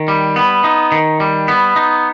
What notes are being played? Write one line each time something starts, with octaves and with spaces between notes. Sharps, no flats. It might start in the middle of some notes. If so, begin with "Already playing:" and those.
Already playing: D#3
G3
B3
D#4
D#3
G3
B3
D#4